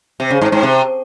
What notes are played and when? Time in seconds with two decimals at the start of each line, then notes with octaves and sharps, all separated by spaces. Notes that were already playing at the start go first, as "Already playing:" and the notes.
0.20 C3
0.31 C#3
0.41 G#2
0.52 G#2
0.63 C3